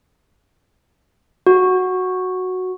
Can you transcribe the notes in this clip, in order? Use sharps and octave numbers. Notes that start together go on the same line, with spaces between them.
F#4